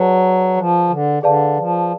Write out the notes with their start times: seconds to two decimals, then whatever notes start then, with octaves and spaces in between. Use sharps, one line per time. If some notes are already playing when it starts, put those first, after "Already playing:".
Already playing: F#3 G#4 B4 D5 F#5 A5
0.57 F3
0.89 D3
1.23 D3 G#4 B4 D5 F5 A5
1.57 F3